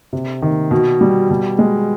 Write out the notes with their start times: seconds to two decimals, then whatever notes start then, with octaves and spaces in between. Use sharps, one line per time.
0.13 C3
0.42 D#3
0.71 B2
1.01 G3
1.30 B2
1.59 G#3